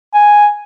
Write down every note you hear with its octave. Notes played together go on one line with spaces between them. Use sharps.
G#5